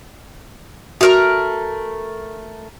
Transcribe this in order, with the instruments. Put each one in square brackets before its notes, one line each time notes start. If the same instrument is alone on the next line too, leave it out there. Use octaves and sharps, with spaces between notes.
[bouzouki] A3 A#4 A#5 [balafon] F#4